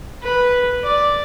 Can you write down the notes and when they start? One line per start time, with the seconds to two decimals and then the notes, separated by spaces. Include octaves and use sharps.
0.22 B4
0.84 D5